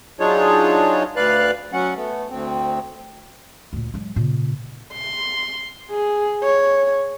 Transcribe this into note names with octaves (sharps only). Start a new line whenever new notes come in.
F#3 D4 D#4 F4 G#4 C#5
D2 B4 D5 F5 F#6
F#3 C#4 F#5
A3 B3
D2 C4
D2 A#2
F#3 G#3
A#2 C#3
C6
G#4
C#5